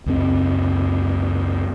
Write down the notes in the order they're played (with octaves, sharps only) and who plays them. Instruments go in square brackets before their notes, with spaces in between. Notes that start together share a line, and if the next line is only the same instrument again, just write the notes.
[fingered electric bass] C#2 F#2 C4